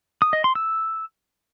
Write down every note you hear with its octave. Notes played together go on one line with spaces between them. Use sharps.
D#6
D#5
C6
E6